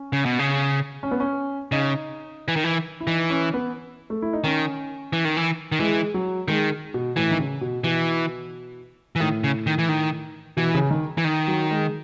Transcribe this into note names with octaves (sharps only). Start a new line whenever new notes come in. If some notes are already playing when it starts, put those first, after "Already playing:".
Already playing: C#4
C#3
B2
C#3
C#4
B3
C#4
C#3 D#4
E3
D#3
E3
E4
E3 D#4
C#4
B3
A3
E4
D#4
D#3 C#4
E3
D#3
E3
D#3
E3 G#3
F#3
D#3 G#3
B2
A2 E3
D#3
C#3
B2
B2 E3
E3
A2 D#3
C#3
D#3
E3
D#3
B2 E3
C#3
D#3
E3
D#3
F#3
G#3